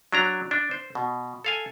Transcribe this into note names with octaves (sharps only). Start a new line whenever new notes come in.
F#3 D4 A#5
D4
C5
B2
A4 F5 G#5